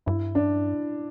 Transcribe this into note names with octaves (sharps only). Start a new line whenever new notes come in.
G2 E4
D4